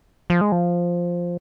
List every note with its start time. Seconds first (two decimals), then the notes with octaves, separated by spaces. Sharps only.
0.30 F3
0.41 G#3
0.52 F3